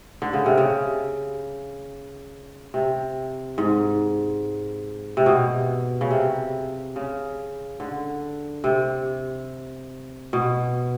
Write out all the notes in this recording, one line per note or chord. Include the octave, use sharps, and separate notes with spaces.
D3
C#3
C3
C#3
C3
G#2
C3
B2
C#3
C3
C#3
D3
C3
B2